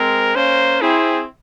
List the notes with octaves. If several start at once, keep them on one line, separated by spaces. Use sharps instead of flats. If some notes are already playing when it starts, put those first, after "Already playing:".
Already playing: G#3 C4 A#4
A#3 C#4 C5
C4 E4 G#4